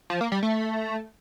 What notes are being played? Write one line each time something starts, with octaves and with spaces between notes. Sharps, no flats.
F3
A#3
G3
A3